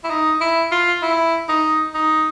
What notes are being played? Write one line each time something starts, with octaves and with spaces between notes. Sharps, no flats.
E4
D#4
E4
F4
E4
D#4
D#4